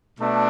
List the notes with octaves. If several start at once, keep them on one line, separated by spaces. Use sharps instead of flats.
B2 A3 D4